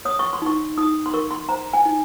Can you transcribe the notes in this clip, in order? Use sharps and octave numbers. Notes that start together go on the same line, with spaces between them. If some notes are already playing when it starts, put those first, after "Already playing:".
C#5 D#6
C#6
C6
D#4 C#6
D#4 D#6
C6
A#4 C#6
C6
C5 A#5
G#5
D#4